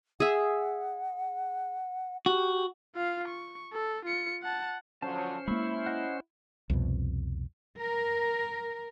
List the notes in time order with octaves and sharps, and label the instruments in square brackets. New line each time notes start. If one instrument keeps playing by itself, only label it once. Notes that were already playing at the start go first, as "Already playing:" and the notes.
[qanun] G#4 E5 [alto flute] F#5
[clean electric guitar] F#4 [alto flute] G4
[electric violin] F4 F5
C#6
A4
F4 C#7
F#5 A5
[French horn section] D3 F3 F#3 [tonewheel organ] C#4 C5 [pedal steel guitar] C#5 F5 A5
[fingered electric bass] G#3 A#3 [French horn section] E4 [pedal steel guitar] B5 C#6 E6
[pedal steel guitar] D#5 F#5
[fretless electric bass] C2 F2 B2
[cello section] A#4